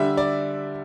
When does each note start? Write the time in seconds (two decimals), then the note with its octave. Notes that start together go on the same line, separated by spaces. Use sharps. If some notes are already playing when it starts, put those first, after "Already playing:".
Already playing: D3 G3 E5
0.17 D5